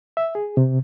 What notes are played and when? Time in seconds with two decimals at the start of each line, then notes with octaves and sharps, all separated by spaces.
0.17 E5
0.35 G#4
0.57 C3